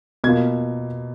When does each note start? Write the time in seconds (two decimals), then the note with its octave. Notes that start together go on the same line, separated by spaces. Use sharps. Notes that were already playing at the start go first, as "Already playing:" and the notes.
0.24 B2 A#3 F4 G#6